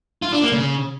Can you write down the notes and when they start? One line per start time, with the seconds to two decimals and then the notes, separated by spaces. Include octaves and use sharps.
0.22 F4
0.32 D4
0.42 A#3
0.52 C#3